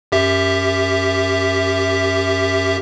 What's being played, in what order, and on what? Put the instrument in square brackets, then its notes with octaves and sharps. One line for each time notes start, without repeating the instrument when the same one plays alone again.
[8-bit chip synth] F#2 G4 E5